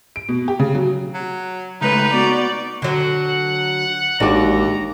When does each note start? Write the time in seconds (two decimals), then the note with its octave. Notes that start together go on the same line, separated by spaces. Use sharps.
0.16 D7
0.29 B2
0.48 G4
0.60 C#3
0.75 F#3
1.14 F#3
1.82 C#3 G#3 A3 D#4 B4
2.13 B3 F#4 D5
2.82 D3 F#3 F#5
4.20 A1 D#2 G#3 D4 F#4 A#5 D6